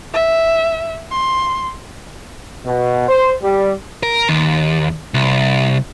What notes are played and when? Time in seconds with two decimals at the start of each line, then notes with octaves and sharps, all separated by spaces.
0.13 E5
1.11 C6
2.66 B2
3.09 C5
3.43 G3
4.03 A#4
4.29 D#2
5.14 C2